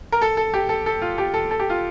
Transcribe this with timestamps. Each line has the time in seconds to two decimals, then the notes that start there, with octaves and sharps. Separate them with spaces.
0.12 A#4
0.22 A4
0.37 A4
0.54 G4
0.69 A4
0.86 A4
1.02 F4
1.18 G4
1.34 A4
1.51 A4
1.60 G4
1.70 F4